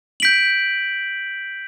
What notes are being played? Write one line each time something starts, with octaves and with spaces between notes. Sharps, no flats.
G6 B6 D7 F#7